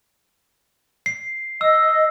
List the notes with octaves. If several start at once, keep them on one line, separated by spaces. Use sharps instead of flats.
C7
D#5 E6